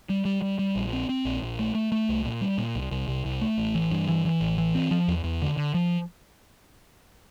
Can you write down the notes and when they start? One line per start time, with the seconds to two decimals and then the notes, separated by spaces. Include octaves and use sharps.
0.09 G3
0.25 G3
0.42 G3
0.59 G3
0.76 A#1
0.93 C4
1.09 C4
1.25 A#1
1.42 A#1
1.59 A3
1.75 A3
1.92 A3
2.09 C2
2.25 A#2
2.41 G3
2.58 A#2
2.75 C2
2.91 C2
3.08 C2
3.25 C2
3.41 A3
3.58 A1
3.75 E3
3.91 G2
4.08 E3
4.25 E3
4.41 A1
4.58 E3
4.75 C4
4.91 F3
5.08 E2
5.24 E2
5.42 D3
5.57 D3
5.74 F3